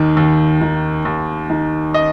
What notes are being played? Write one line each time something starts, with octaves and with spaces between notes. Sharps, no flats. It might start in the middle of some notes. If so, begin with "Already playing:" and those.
Already playing: D#2 D#3
D#2
D#3
D#2
D#3
D#5